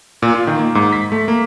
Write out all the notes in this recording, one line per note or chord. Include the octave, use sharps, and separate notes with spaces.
A#2
F4
D#3
A#3
G#2
B6
A3
A#3